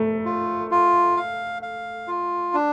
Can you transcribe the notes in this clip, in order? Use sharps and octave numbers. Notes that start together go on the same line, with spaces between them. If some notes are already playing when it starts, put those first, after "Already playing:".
Already playing: A3
F4
F4
F5
F5
F4
D4